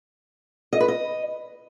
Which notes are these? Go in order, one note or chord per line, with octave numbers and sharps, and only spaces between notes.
D#5
B4
D#5